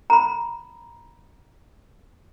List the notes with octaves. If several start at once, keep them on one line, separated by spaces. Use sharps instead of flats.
A#5 B5